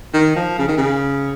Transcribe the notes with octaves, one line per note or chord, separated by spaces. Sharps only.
D#3
F3
C#3
D#3
C#3